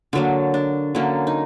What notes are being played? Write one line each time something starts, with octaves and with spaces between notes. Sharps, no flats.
D3 F#3 A#3 D4
D4
D3 F#3 A#3 C#4
D#4